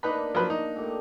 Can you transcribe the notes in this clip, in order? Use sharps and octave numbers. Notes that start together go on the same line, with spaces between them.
A#3 D4 D#4 B4 B5
F3 F#3 B4
D#4
A#2 A3 G4